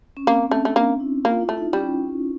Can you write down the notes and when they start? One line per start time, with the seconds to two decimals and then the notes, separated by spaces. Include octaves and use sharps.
0.17 C#4
0.27 A#3 C4
0.43 C#4
0.51 A3
0.60 D4
0.65 A3
0.76 A#3
1.00 E4
1.25 A#3 F4
1.41 E4
1.49 A3
1.57 D#4
1.73 G3 C#4